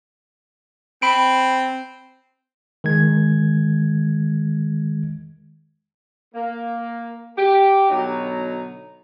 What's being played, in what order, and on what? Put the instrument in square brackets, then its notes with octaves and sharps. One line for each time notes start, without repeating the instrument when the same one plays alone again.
[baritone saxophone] C4 [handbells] B5 D7
[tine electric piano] D#3 G#3 G#6
[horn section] A#3
G4
B2 D3 F#3 D#4 A#5